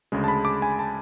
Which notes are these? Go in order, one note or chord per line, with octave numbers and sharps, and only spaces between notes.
D2 C#3 G#3
A5
B5
D6
G#5
A5